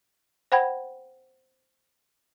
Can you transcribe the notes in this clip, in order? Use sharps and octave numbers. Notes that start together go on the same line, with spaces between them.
C5 F#5 G5 B5 G#6